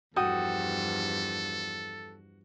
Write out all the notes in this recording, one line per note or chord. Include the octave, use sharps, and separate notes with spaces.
E2 G2 F3 F#4 A4 G5 D#6